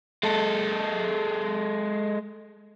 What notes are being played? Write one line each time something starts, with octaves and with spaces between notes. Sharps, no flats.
G#3 A4